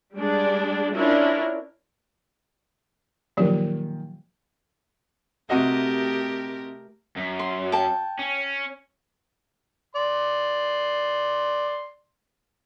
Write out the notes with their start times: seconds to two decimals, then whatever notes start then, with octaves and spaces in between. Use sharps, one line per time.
0.15 G3 G#3 D4 G#4
0.94 C#4 D4 E4 F4 A#4
3.37 A#2 D#3 F3 F#3 G4
5.50 C3 A3 F#4 G4 A#4 D#5
7.17 F#2
7.39 C6
7.72 G5 A5
8.19 C#4
9.96 D5 C6